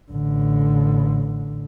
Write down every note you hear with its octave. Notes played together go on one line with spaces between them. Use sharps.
A1 D3